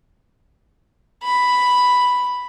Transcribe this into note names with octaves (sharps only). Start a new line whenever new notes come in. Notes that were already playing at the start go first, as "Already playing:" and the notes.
B5